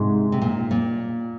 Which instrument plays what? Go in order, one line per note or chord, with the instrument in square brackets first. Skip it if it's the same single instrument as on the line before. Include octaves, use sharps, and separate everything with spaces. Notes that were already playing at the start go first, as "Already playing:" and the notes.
Already playing: [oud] G#2 [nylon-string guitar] C3
[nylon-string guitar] C3
A#2
A#2